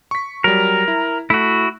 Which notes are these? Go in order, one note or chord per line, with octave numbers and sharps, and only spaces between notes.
C#6 B6
F#3 G3 A#4
E4
A3 E4 F#4